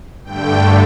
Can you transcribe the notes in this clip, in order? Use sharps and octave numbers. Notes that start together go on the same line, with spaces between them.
G2 D3 A3 G5